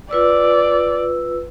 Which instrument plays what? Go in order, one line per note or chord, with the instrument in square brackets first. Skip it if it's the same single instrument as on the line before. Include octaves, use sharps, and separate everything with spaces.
[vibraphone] F4 B4 E6 [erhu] D5